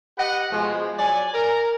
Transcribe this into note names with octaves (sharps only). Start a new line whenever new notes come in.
G4 B4 D#5 F#5
B2 F3 G#3
F#3 D5 G#5
A#4